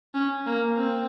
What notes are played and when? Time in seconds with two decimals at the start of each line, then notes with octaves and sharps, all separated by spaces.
0.14 C#4
0.46 A#3
0.77 C4